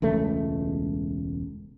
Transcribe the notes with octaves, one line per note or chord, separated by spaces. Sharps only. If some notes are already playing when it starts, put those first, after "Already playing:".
E1 C#2 A3